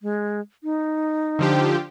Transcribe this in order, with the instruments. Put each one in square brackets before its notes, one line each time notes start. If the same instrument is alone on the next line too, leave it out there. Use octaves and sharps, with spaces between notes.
[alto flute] G#3
D#4
[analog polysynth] D3 F3 G4